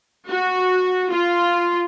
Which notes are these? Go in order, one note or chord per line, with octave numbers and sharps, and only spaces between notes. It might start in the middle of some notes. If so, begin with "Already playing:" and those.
F#4
F4